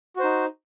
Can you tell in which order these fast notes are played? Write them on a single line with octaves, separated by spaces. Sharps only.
F#4 C5 D#4